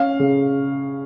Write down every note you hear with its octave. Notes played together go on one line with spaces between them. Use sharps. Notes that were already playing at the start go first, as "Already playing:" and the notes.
Already playing: C#4 F5
C#3